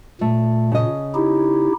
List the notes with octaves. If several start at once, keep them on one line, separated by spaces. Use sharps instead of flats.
A#2 A3
C#3 D#5
D#4 E4 G4